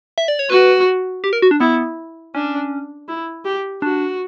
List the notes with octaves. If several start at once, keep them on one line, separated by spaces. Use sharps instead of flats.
E5
D5
C#5
F#4 B4
G4
A#4
F#4
D4
B3 E4
C#4 D4
E4
G4
D4 F#4